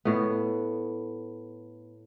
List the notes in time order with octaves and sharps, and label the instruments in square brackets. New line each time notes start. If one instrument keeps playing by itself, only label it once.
[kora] A2 B3